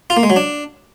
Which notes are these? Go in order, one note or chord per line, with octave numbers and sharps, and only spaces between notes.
F4
A#3
G#3
F#3
D4